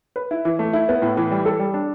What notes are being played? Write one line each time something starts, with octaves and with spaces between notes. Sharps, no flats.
B4
E4
E3
A3
E4
B3
A2
E3
G3
A4
G3
D4